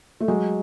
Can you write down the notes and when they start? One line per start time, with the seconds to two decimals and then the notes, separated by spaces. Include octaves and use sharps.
0.21 A3
0.28 F#3 G#3